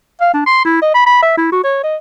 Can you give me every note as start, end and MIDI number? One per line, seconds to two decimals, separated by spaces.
0.21 0.32 77
0.34 0.45 62
0.46 0.64 84
0.65 0.79 64
0.82 0.93 75
0.94 1.04 83
1.06 1.22 83
1.23 1.34 76
1.37 1.50 64
1.52 1.63 66
1.64 1.81 73
1.84 1.96 75